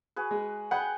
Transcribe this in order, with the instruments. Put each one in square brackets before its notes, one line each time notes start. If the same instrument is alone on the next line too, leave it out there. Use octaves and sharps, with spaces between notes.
[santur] F#4 G#4 B4
[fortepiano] G#3
[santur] G#4 B4 G5 [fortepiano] F#5 B5